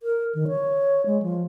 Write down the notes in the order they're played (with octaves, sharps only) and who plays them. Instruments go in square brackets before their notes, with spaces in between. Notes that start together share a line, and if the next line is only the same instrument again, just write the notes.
[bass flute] A#4
D#3
C#5
G#3
F3